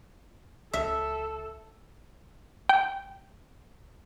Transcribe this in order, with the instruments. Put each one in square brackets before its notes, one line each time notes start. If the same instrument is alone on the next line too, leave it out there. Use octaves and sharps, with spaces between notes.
[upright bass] C#2 [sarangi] A4 [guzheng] E5
[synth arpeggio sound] G5